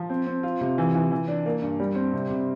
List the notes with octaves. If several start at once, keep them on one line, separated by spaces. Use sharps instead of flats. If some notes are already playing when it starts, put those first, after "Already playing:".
Already playing: F3
C4
C4
F4
C3
E3
E3
E3
D4
A#3
G2
G3
C4
C3
C3